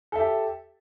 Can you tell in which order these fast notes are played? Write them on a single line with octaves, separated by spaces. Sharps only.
A4 E5 G4